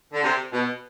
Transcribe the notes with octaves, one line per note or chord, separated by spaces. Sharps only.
D3
C3
B2